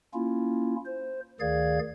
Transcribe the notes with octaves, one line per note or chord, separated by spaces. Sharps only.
A#3 C#4 E4 F4
C5
D2 D#3 G#4 D5 F5 G#6